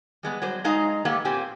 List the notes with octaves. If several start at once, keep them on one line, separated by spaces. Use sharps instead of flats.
G3 G#3 B3
F#3 G3 C5
G#3 D#4 D#5 F5 A#5
A#3 B3 G4 A4
A#2 A#3 C4 G4 G#5